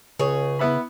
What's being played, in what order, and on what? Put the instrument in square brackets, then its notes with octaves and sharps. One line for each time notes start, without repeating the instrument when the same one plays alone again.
[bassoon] C#2 [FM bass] C#3 [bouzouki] G#4 C#5
[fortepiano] B3 E4 B5